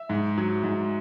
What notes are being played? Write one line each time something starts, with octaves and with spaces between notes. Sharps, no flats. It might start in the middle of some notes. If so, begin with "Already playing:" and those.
Already playing: E5
G#2
F#3
G#2